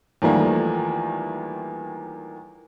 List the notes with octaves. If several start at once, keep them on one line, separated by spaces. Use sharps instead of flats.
E2 D#3 F3 G3 A3 A#3